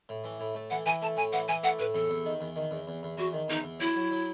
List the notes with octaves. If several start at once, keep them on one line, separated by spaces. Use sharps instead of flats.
A2
E3
A2
A3
E3 F#5
E3 G#5
A3 A5
A2 G#5
E3 F#5
E3 G#5
A3 F#5
A2 B4
E2 A4
E2
D#3
E2
D#3
E2
E2
E2
E2 F#4
D#3
E2 D#4
E2
F#3 E4
F#3
F#3